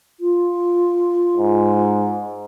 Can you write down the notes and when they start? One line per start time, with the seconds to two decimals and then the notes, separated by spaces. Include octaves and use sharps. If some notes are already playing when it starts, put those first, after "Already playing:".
0.20 F4
1.37 G#2